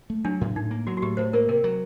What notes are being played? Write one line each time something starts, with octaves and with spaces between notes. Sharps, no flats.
A3
F#3 D4
A2
A2 D#4
A#3
F#3 F#4
F#4
A2 G4
A2 C5
A#3 A#4
C3 A#4
F#3